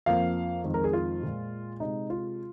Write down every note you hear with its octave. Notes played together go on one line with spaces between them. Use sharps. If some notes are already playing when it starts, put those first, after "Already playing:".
F2 F3 A#3 F5
F2 D#3 G#3
A#4
G#4
F4
A#2 G#3
C3 G#3 D#4
F4